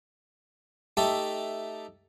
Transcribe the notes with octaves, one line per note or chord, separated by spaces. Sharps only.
A3 D#4 G4 A4 E5